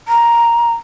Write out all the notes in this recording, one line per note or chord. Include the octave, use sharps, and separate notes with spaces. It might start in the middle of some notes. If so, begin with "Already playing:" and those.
A#5